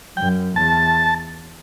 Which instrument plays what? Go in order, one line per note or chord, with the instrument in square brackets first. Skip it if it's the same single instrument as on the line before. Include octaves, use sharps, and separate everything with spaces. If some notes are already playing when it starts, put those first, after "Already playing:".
[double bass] F#2 [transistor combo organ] G5
[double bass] E2 [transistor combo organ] A5